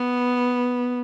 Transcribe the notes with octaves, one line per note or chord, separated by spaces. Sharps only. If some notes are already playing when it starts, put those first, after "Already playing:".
Already playing: B3